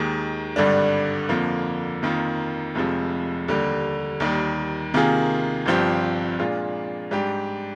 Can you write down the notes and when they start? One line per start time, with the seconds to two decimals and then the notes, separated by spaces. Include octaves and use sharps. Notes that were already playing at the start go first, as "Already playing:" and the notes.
Already playing: D#2 D#3 G#3
0.56 G#1 G2 D3 G3 D4
1.29 F2 D3 F3 A#3
2.03 F2 D#3 A#3 F4
2.75 F1 F2 C3 F3 G#3
3.48 D#2 D3 G3
4.20 D#2 D#3 G3
4.94 C3 D#3 A#3 F4 G#4
5.66 G1 G2 F3 C4 G4
6.39 A#2 G#3 D4 F4
7.11 G#2 G3 D4 G4